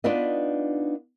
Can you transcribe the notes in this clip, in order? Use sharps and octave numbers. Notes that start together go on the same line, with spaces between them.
B3 D4 D#4 F4 B4 D#5